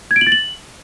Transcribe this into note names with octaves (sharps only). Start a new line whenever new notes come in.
G#6
D7
F#7
A6
F#7